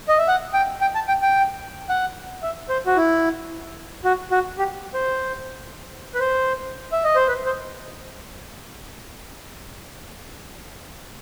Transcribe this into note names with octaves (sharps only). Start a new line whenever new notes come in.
D#5
E5
F#5
G5
G5
A5
G5
G5
F#5
E5
C5
F#4
E4
F#4
F#4
G4
C5
B4
C5
E5
D#5
C5
B4
C5